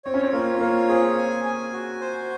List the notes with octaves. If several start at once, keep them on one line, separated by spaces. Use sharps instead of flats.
C4 C#5
C#4
C4
A#3 F4
C4
A#3 C#5
C4 G#4
G#5
G#5
F#4
C5